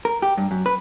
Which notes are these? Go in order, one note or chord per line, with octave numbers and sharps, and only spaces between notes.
A#4
G4
G2
F#2
B4